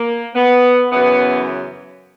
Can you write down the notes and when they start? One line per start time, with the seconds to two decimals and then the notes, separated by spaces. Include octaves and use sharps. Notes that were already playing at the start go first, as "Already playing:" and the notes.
Already playing: A#3
0.35 B3
0.91 F#2 C#3 E3 B3